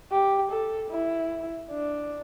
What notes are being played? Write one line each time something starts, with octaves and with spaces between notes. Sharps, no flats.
G4
A4
E4
D4